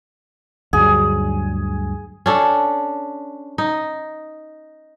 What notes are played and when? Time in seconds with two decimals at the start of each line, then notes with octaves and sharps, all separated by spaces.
0.73 D2 G2 F#3 G#4
2.26 C#4 D4 A4
3.58 D#4